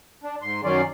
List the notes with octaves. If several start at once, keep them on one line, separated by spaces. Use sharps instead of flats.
D4
G#2 C6
F#2 D#3 F#3 C#4 D5 C6